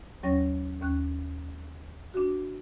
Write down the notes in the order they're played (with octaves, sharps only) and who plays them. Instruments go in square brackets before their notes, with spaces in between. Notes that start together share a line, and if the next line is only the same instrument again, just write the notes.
[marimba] D#2 F#3 C#4 C#5 A#6
D#2 C#4 F#6
D4 F#4